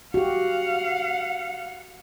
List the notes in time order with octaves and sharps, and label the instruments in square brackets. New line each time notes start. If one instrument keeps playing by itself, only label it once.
[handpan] F#4 G4 [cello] F5 F#5